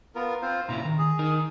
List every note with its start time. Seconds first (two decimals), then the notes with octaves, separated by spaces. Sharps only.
0.15 B3 F4 A#4
0.42 C4 F4 C5
0.69 A#2 C#3 E4 A#5
0.85 D#3
0.98 G#4
1.19 D#3 D#4 A#4